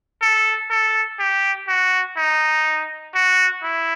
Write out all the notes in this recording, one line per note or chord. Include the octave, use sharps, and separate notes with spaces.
A4
A4
G4
F#4
D#4
F#4
E4